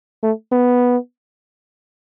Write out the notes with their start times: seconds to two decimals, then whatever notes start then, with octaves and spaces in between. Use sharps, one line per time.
0.22 A3
0.52 B3